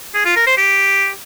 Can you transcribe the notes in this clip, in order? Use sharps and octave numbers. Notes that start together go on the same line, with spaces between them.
G#4
F4
A#4
C5
G4